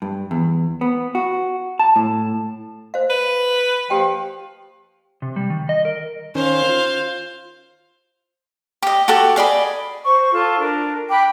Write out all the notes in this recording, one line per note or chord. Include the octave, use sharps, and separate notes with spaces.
G2
E2
B3
F#4
A5
A2
C5 F5
B4
F3 G4 G5
C3
G3
D#3
D#5
A#4
D#3 C#4 C5 F5
F4
G4 D#5
F#4 G4 A4 C#6
G#4 D5 D#5 B5
C5 C#6
F4 A4 A5
D4 A#4
G5 B5 D6 F#6